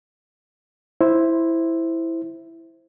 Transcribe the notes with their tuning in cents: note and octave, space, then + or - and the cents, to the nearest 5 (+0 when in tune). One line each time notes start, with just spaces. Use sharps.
E4 +0 C5 +0